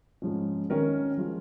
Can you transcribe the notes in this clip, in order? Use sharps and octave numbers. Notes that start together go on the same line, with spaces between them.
G#2 F3 C#4
D#3 C#4 A#4
F3 G#3 F4